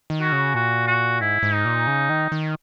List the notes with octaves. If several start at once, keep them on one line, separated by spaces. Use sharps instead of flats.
D#3
F#4
C#3
A#2 F#4
F#4
G#2 E4
G#2
D#4
A#2
C#3
D#3
D#3